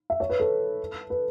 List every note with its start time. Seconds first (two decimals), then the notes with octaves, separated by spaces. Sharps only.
0.10 E5
0.20 C#5
0.30 B4
0.40 A4
1.10 B4